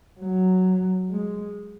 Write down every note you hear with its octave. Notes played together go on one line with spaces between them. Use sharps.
F#3
G#3